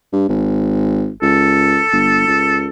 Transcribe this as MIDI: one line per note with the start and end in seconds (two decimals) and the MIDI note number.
0.13 0.25 43
0.29 1.10 32
1.22 1.81 37
1.22 2.68 69
1.93 2.27 31
2.28 2.69 37